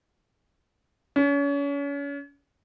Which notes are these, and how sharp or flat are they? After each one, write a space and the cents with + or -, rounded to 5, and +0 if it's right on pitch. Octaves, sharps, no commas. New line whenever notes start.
C#4 +35